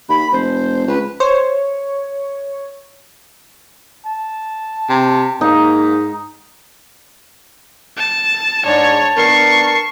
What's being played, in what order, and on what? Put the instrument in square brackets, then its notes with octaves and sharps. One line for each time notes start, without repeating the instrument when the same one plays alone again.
[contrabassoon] D#2 [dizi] B5
[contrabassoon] F1 [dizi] C5
[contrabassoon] C#2 [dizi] B4
[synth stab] C5 [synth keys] C#5
[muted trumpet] A5
[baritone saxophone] C3
[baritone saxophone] G#2 [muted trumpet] A#3 [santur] D#4
[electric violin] A5
[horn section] G#2 D4 [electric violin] C#5 [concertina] A5
[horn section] B3 D4 A#4 [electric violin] C#6 C7